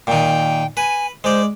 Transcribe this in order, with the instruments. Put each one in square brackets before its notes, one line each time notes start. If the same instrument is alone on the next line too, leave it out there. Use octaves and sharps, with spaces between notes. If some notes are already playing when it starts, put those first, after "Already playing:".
[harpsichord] A#2 D#3 [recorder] G5
[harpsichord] B4 [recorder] G#5
[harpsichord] G#3 D5 [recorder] C5